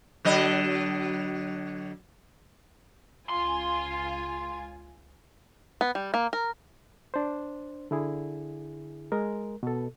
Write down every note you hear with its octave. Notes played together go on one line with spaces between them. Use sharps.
D3 F#3 D#5
C#2 F4 G#5 C6
B3
G3
A#3
A#4
D4 C5
D3 E4 G#4
G#3 A#4
B2 A4